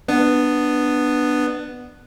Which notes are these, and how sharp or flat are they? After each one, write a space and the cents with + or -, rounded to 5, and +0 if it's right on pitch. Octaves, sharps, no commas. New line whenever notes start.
B3 +0 D4 +15